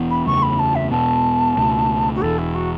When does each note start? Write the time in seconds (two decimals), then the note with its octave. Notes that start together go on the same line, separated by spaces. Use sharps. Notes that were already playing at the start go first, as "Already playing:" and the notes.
Already playing: E1 E3 B3
0.10 B5
0.26 F#1 E2 C#3 A3 C#6
0.42 B5
0.59 A5
0.75 E5
0.91 E2 B2 B3 A5
1.57 C#2 B2 A3
2.15 F#4
2.21 E1 E2 E3 A4
2.38 E4
2.54 F#4